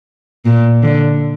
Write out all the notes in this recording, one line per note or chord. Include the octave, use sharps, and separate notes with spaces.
A#2
D3